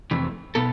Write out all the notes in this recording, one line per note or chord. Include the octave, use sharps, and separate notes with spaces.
F2 C3 E3 A3
B2 B3 A4